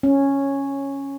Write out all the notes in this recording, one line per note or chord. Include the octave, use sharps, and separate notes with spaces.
C#4